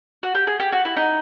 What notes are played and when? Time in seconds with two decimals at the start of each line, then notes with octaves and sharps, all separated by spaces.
0.23 F#4
0.35 G4
0.47 G#4
0.60 G4
0.72 F#4
0.85 E4
0.96 D#4